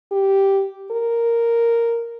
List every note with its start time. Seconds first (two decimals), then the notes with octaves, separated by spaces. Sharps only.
0.12 G4
0.91 A#4